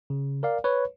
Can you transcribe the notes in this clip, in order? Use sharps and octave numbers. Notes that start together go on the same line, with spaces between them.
C#3
A#4 D5 F5
B4 C#5